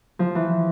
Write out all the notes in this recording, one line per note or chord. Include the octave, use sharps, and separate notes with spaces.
F3
E3